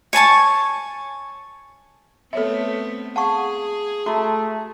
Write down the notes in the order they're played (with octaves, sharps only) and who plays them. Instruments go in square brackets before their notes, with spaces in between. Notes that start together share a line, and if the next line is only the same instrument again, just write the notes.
[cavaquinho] C#5 G#5 A5 C#6
[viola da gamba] A3 B3 C4 [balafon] A4 C#5 E5
[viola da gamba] G#4 [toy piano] F5 A5 C#6 [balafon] F#5
[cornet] A3 [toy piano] F#4 [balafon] A5 A#5